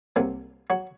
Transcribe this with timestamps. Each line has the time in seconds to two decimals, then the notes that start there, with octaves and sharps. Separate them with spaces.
0.16 C2 C3 F#3 A#3
0.70 F#3 F#4